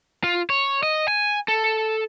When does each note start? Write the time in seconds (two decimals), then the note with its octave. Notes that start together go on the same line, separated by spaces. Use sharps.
0.24 F4
0.50 C#5
0.83 D#5
1.08 G#5
1.48 A4